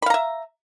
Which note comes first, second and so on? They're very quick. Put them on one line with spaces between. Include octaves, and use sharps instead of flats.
B5 F5 A#5 E5